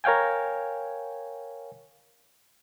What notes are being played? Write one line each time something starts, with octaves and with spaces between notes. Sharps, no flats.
A#4 C#5 F5 G5 G#5